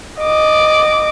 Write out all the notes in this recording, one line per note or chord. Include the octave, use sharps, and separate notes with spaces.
D#5 D6